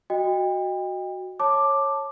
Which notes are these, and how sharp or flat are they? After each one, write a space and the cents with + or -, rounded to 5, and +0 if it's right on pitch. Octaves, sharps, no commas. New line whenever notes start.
F#4 +0 D#5 +0 G5 +30
C#5 -15 A5 +0 D6 +5